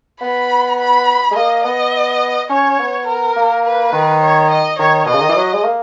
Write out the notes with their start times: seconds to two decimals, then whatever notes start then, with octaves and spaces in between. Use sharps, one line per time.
0.21 B3 B5
0.79 B5
1.31 G#3
1.36 A#3 D#5
1.64 B3 D#5
2.50 C#4 C#5
2.79 B3
3.07 A#4
3.36 A#3
3.65 B4
3.93 D#3
4.22 C#5
4.50 D#5
4.79 D#3 C#5
5.05 B2 D#5
5.13 C#3
5.21 D#3
5.29 E3
5.36 F#3
5.53 G#3
5.64 A#3